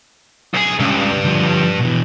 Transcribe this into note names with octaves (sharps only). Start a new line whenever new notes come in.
B1 G#4
C#2 G2 C#3
D3 F3
B2 E3